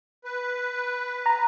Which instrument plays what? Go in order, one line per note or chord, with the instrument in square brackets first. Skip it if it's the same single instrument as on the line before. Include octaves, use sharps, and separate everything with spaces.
[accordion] B4
[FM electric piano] A#5